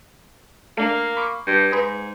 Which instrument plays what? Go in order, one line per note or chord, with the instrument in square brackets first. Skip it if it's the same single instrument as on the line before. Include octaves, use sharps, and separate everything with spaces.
[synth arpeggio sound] A3 D4 [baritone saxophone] A#3
[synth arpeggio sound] B5 C#6 D6
[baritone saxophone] G2
[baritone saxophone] G#2 [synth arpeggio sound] B4 D#6 A#6